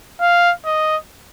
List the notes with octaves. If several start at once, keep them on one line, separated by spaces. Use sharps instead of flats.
F5
D#5